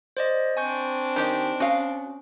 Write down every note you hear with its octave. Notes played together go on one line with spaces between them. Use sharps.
C5 D5 D#5
C4 D4 G#5 C#6 G6
D#3 G4 D#5
C#4 F#4 F5